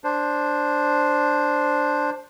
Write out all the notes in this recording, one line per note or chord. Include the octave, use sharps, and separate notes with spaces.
D4 C5